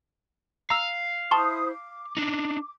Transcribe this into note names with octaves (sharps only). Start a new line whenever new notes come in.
F5 A#5 E6
E4 C5 A5 C6 C#6 D#6
D6
D4 D#4